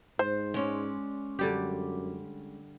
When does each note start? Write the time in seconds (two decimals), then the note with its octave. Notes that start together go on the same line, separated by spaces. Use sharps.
0.19 G#2 C5
0.54 G#3 C#4 D5
1.39 F#2 D3 G3 G4